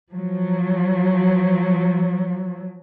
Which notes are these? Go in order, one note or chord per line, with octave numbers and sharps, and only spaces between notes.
F3 F#3